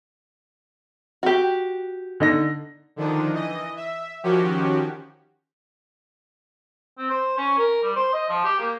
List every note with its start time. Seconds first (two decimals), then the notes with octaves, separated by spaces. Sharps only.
1.23 F#4 G4
2.20 D3 D#4 A#6
2.96 D3 D#3 F3 D4 D#4
3.32 E3 D#5
3.77 E5
4.24 D#3 F3 C#4 F#4 G4
6.98 C4
7.11 C5
7.38 C#4
7.58 A#4
7.83 G3
7.96 C5
8.13 D#5
8.29 F3
8.45 G4
8.59 A#3